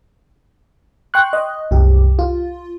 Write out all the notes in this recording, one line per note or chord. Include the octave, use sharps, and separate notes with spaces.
G5 C6 C#6 F#6
D#5
C2 F#2 G4
F4